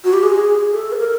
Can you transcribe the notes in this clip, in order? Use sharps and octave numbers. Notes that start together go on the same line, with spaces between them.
F#4
G4
G#4
A4
B4
A#4